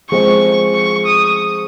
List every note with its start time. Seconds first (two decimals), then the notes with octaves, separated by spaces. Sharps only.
0.10 F3 G#3 C4 C#6
0.74 C#6
1.06 D#6